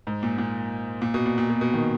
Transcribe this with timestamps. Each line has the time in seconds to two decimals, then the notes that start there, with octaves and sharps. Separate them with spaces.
0.07 G#2
0.23 A#2
0.38 A#2
1.02 A#2
1.14 B2
1.26 A#2
1.38 A#2
1.50 B2
1.61 B2
1.74 D#3